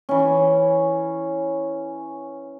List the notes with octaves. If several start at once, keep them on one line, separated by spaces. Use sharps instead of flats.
E3 C#4